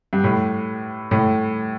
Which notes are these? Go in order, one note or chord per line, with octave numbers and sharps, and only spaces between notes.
G2
A2
A2